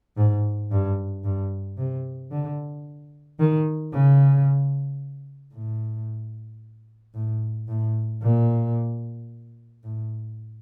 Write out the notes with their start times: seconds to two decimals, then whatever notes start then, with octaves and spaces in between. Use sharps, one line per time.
0.17 G#2
0.71 G2
1.24 G2
1.77 C3
2.31 D3
3.39 D#3
3.93 C#3
5.53 A2
7.14 A2
7.68 A2
8.22 A#2
9.84 A2